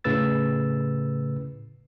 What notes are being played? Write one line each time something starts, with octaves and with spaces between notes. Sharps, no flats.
A2 C#3 B4 E6 A6